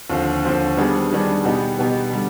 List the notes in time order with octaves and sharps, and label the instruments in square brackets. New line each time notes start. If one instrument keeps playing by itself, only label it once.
[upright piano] D#2 D3 F3 C4
D#2 D3 F3 C4
D#3 G3 B3 D4 G#4
D#3 G3 B3 D4 G#4
B2 B3 D#4 G4
B2 B3 D#4 G4
D3 G3